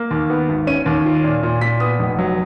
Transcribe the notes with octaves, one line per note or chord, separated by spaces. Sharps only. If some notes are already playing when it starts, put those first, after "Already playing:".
Already playing: A#3
D#2
B3
G#1
C#4 D#7
D#2
F4
A#2
A#2
A#2 B6
B3 D#6
F1
F#3